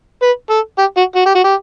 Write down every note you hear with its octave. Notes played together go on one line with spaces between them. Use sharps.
B4
A4
G4
F#4
F#4
G4
F#4
G4